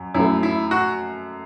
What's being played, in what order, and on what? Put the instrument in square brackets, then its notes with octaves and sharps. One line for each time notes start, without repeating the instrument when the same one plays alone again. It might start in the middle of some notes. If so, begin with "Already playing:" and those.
Already playing: [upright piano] F#2
[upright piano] F#2 F#3 A3 [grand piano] E4
[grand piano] E4
F#4